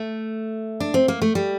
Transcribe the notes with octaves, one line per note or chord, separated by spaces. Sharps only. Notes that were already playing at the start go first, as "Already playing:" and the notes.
Already playing: A3
D4
C4
A#3
A3
G3